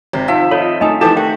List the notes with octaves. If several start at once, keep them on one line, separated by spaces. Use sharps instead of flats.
G#1 C3
D#3 F3 E5
F4 A4 C#5 D#5 B5
A3 D#4 A4 D#5 G#5 D#6
E3 F3 A3 D#4 G4 A4 A5
D#3 A3 F#4 G5